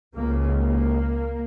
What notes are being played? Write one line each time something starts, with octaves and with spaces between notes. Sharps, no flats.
C#2 C#3 A#3
A#3